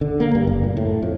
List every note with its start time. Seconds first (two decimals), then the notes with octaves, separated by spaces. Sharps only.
0.01 D3
0.20 A#3
0.35 G2
0.47 F#1
0.64 A#2
0.77 A2
1.03 F2